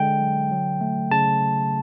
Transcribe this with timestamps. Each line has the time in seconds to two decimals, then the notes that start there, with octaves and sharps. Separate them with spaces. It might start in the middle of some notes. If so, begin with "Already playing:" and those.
Already playing: D3 G#3 G5
0.21 F#3
0.51 F#3
0.81 A3
1.11 C#3 A5